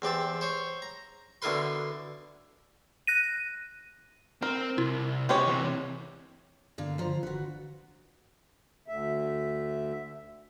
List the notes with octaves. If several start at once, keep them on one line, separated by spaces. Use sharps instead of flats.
E2 C4 G4 A5
C5 C#5
A#5
B2 D3 E4 A#4 B4 C6
F#6 A#6 D#7
C4 A#4
C2 E4
G#3 B3 C#4 G4 C#5
C3 E3
G2 D3 A#3 F5
D3 F3 F4 C5 A#5
F1 D3 F#4 B4
D2 E5